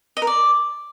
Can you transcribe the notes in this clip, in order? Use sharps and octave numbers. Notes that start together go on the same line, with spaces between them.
D#5
A#4
D5